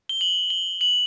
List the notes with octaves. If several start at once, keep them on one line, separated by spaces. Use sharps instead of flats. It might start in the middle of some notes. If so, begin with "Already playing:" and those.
G7
F#7
G7
F#7